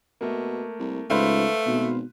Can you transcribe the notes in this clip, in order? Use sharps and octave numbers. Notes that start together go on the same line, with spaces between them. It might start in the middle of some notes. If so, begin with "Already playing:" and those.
B2 A3 A#3
C2
C#2 G#2 A3 B4 C5 F5
G#1 B2